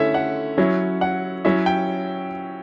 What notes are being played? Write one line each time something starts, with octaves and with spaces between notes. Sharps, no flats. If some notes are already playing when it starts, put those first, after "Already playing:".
Already playing: D3 A3 C#4 E4 E5
F#5
F#3 C#4 E4
F#5
F#3 C#4 E4 E5
G5